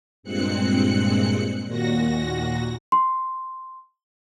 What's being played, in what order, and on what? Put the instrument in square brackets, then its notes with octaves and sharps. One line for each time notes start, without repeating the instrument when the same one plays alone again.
[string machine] G2 A#2 G#3 C4 F#6 C#7
D#2 A#2 F#4 A#6
[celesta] C6